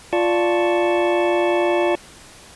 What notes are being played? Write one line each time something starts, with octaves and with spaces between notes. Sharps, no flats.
F4 D5 A5 C#6